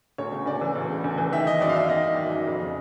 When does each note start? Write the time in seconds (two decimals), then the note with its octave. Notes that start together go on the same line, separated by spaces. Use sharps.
0.18 D2 C#5
0.32 C#3
0.46 D2 D5
0.61 E3
0.76 D2
0.90 C#3
1.04 D2
1.18 E3
1.32 D#3 E5
1.47 D#3 D#5
1.61 F#2 D5
1.69 F5
1.75 F#2 E5
1.89 D#3 D#5
2.04 D#3
2.18 F#2
2.32 F#2
2.47 F2
2.62 C#3